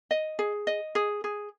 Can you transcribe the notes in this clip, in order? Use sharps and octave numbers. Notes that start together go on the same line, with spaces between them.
D#5
G#4
D#5
G#4
G#4